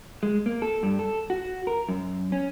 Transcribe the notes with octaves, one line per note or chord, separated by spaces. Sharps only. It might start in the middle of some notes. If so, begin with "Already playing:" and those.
G#3
A#3
A4
G2
A4
F#4
A#4
F#2
C#4